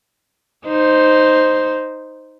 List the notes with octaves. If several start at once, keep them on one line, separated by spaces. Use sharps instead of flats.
D#4 C5